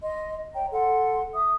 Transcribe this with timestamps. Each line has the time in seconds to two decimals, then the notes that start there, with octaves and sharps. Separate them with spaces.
0.02 D#5 C6
0.54 C#5 G5 A#5
0.72 A4 F#5 C6
1.33 E5 D#6